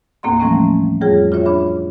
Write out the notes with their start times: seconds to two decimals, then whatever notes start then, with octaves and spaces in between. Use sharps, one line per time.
0.23 D#2 A2 A#3 C4 F5 C6
0.40 E3 F3 G3 A3 C4 C#4
1.01 F2 G3 F4 G#4 C#5
1.32 F4 F#4 C#5 E5
1.46 D4 E5 B5